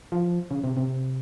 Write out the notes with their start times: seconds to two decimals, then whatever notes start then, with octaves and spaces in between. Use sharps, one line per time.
0.12 F3
0.51 C#3
0.64 C3
0.77 C3